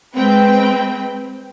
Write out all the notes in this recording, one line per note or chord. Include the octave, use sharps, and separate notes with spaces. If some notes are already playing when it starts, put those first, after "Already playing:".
G#3 C4 B4 G5